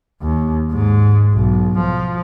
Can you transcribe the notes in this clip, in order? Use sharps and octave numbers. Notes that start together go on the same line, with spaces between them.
D#2
G#2
B1
F3